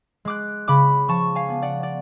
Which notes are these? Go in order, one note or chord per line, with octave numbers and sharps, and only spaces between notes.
G#3 D6 F#6
C#3 B5 D6
F3 A5 C#6
F5 G#5
B3
D5 F#5
D5